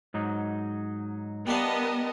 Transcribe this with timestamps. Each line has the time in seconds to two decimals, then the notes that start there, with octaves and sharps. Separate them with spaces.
0.14 G#2 F#3 D#4
1.47 G3 B3 D4 A#4 D#5 F5 A5